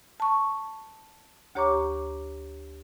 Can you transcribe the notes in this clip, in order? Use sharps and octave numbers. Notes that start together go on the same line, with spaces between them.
A5 C#6
D2 G4 C#5 A#5 C#6 D6